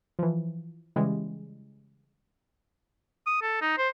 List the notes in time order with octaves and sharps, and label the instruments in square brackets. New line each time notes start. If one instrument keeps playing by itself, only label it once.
[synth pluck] E3 F3
C#3 E3 G3 G#3
[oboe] D#6
A4
D#4
C5